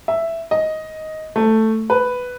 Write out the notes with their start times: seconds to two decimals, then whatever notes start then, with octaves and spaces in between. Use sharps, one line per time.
0.08 E5
0.51 D#5
1.36 A3
1.90 B4